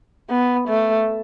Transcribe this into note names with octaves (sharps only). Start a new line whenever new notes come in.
B3
A3